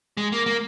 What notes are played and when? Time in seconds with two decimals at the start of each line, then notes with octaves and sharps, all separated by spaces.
0.17 G#3
0.32 A#3
0.46 A#3